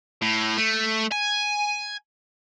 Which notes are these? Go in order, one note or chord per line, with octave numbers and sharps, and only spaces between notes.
A2
A3
G#5